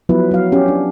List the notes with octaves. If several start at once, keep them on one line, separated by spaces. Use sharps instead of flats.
F3 F#3 B3 E4 B4
F#3 F5
C#4 G4
D4